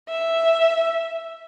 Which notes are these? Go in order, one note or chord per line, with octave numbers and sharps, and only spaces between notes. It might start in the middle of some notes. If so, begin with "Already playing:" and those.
E5